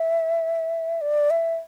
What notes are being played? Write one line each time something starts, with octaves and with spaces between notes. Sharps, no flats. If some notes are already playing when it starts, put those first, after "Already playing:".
Already playing: E5
D5
E5